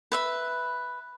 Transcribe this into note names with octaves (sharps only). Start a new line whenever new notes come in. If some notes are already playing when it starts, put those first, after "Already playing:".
B4 E5 B5